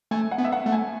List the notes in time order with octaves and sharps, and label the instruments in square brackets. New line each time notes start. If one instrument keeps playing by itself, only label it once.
[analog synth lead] A3 [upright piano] G#5
[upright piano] F#5
[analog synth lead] B3
[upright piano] E5
F#5
[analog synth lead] A3
[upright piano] G#5